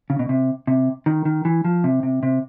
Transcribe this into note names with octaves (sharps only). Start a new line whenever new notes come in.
C#3
B2
C3
C3
D#3
D#3
E3
F3
C3
C3
C3